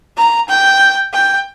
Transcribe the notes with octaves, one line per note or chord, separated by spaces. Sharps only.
A#5
G5
G5